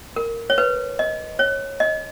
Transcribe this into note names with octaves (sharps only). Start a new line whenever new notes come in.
A#4
C#5
B4
D#5
C#5
D#5